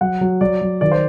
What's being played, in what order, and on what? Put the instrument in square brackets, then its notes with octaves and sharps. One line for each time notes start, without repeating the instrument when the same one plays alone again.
[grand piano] F#3 F#5
F#3
F#3 D5
F#3
D#3 D5
C5